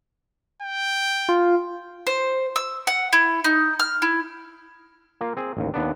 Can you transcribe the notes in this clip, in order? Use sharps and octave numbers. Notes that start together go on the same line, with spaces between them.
G5
F4
C5
E6
F#5
E4
D#4
F6
E4
A#3 F4
C4 G#4
A1 D#2
D#2 B3 D4